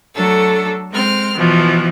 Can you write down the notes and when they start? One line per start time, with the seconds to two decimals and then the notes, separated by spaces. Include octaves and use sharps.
0.14 F#3 A3 D4 A4
0.90 G#3 C4 F6
1.37 B2 E3 F3